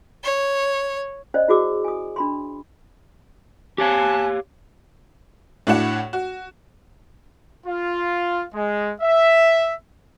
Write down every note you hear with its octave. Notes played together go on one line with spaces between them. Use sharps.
C#5
C#4 C5 D5 D#5
E4 F#4 G#4 D6 E6
G#5 D#6
D4 B5 C6
G4 C#5 F5 G#5 A5 F#6
A2 D4 E4 F#4 F#5 E7
F#4
F4
G#3
E5